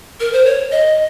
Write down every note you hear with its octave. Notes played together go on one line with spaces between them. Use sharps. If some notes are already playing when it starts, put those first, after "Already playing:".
A#4
C5
C#5
D#5